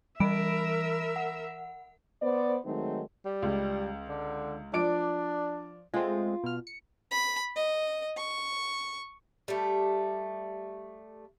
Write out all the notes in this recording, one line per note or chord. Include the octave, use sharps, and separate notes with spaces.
E3 G3 A#4 E5 B5 D7
F#5
B3 C5 D5
D#3 F#3 G#3 A3 C4 D#4
G3
C#2
D3
F3 D4 D5 D7
G#3 A3 C4 F4
B2 F6
C#7
B5
D#5
C#6
G3 A3